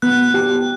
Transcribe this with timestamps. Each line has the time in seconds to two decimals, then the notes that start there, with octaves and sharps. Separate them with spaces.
0.02 B3 F#6
0.34 G4